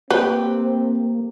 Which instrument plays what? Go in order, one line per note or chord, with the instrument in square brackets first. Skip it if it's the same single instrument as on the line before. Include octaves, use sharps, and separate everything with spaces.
[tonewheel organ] A#3 [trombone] C4 [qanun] G4 [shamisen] B4